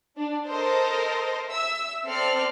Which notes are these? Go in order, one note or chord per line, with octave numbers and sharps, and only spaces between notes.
D4
A4 A#4 C5 D#5
E5 E6
C4 A4 D5 F6 C7